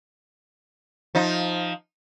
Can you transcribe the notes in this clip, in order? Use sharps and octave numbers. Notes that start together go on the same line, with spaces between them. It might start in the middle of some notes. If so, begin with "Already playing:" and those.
F3 D#4